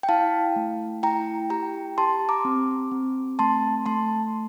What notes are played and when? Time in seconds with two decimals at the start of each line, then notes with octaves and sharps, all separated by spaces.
0.03 G5
0.09 E4 F5 A5
0.56 A3
1.03 E4 G5 A#5
1.50 G4 G5 A#5
1.98 G4 A5 C6
2.29 A#5 D6
2.45 C4
2.91 C4
3.39 A3 A5 C6
3.86 A3 A5 C6